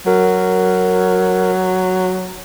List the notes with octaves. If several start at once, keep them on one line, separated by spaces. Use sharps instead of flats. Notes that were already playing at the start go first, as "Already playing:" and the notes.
F#3 A#4